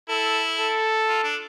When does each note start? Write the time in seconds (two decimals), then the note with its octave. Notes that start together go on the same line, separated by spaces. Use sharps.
0.09 E4 A4
0.59 A4
1.08 F4
1.24 D4